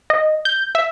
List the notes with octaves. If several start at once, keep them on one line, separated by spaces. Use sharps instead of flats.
D#5
G6
E5